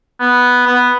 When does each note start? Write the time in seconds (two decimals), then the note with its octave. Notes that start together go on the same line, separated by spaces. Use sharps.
0.21 B3
0.67 B3